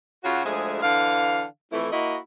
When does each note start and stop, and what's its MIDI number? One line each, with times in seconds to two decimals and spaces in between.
0.24 0.45 49
0.24 0.45 65
0.24 0.45 66
0.45 0.82 38
0.45 0.82 53
0.45 0.82 56
0.45 0.82 57
0.45 0.82 68
0.82 1.43 50
0.82 1.43 52
0.82 1.43 77
1.71 1.90 41
1.71 1.90 52
1.71 1.90 57
1.71 1.90 64
1.92 2.16 58
1.92 2.16 64
1.92 2.16 66
1.92 2.16 75